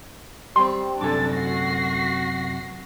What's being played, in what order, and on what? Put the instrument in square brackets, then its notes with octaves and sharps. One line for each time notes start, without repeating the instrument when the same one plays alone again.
[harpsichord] G3 C4 [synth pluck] C6
[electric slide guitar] F#2 C3 G#5 [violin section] D4 A6 [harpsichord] A4 D6
[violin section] F#4 A#6 C7